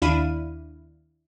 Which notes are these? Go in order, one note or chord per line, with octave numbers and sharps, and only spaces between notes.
D#2 D4 E4 F5 B5 D#7